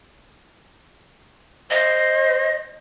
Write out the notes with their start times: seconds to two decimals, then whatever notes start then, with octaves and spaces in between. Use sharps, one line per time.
1.71 C5 D#5